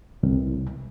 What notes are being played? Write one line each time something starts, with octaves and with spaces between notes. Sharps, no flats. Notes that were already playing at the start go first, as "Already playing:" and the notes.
C2